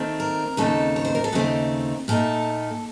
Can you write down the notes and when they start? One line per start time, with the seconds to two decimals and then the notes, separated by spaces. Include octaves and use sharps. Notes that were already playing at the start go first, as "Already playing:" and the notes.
Already playing: D#3 A3 C4
0.20 A#4
0.57 D#2 C#3 A3 C4 D#4 A4
0.96 C#5
1.05 C5
1.15 A#4
1.24 A4
1.32 D#2 C#3 A3 C4 D#4 F#4
2.08 A#2 A3 D#4 A4